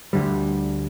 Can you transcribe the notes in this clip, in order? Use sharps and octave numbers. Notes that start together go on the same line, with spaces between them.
D2 D3 G3